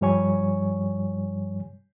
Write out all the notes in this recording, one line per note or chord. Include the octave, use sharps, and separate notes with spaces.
G2 F3 G3 C#5 G#5 C#6